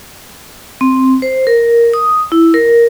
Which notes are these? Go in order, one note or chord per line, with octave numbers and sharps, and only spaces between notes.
C4
C5
A#4
D#6
E4
A#4